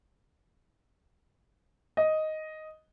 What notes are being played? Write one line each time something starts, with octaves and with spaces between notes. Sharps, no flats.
D#5